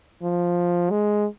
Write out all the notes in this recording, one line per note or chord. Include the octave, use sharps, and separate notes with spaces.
F3
G#3